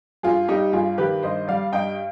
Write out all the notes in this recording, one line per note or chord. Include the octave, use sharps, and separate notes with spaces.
G2 F4 G#4
G3 D#4 G4
G2 F4 G#4
D#3 G4 B4
G2 C5 D#5
G3 D5 F5
G2 D#5 G5